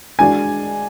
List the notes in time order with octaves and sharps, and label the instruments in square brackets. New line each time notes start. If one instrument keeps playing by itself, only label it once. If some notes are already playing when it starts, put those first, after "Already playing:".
[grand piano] G#3 D4 F#4 D5 [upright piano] G#5